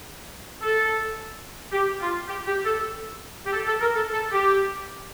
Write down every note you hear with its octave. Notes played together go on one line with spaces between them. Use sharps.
A4
G4
F4
G4
G4
A4
G4
A4
A4
A#4
A4
A4
G4